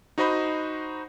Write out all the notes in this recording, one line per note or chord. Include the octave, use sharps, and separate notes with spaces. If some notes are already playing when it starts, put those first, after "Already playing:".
D#4 F#4 C5 D#5 B5